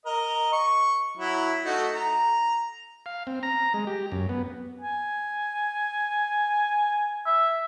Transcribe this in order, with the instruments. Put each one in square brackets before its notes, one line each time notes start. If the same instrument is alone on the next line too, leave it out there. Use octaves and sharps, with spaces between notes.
[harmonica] A#4 D#5
C#6
F#3 E4
A3 D#4 F#4
A#5
[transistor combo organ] F5
C4
A#5
G#3
G4
F#2
B3
[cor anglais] G#5
E5